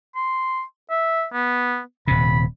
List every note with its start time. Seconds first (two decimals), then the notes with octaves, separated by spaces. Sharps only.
0.15 C6
0.90 E5
1.33 B3
2.08 D#1 C3 B5